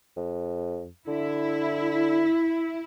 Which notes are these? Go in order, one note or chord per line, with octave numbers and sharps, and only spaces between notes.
F2
D3 E4